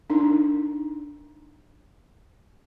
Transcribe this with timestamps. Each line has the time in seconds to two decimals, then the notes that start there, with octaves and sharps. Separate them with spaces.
0.10 D4 D#4